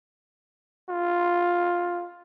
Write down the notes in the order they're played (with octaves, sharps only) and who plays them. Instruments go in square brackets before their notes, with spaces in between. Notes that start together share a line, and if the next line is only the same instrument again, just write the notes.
[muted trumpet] F4